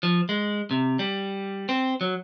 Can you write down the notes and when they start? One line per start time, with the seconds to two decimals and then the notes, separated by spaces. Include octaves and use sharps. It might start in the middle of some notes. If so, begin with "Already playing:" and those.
0.03 F3
0.29 G#3
0.71 C3
0.99 G3
1.69 C4
2.01 F#3